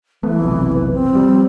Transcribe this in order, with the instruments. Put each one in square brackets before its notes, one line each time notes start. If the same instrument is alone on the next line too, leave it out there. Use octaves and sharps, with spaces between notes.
[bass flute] E3 [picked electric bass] A3 B3
[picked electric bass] F1 B1 F2
[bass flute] B4
C4
[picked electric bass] F3 G3